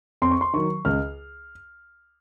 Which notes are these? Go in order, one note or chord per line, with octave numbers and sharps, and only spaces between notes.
F2 C6
C#6
C6
D#3 F#3 C#6
C#2 F6